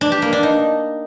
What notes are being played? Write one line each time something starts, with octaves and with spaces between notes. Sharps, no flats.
D4
G4
A#3
D4
D#4